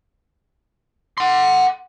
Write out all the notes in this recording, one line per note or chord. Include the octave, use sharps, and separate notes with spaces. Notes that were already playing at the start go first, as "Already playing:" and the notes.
F#5 C6